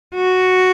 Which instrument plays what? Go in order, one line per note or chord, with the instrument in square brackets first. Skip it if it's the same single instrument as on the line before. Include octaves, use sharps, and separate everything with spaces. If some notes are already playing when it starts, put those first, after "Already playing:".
[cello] F#4